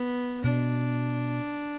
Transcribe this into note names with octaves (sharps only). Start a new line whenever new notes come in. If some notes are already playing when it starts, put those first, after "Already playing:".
Already playing: B3
B2 D4